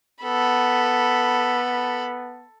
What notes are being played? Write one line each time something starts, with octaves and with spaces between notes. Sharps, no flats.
B3 A4 B5